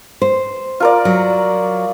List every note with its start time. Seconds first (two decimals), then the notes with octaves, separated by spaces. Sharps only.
0.22 C5
0.80 F4 A#4 D5
1.05 F#3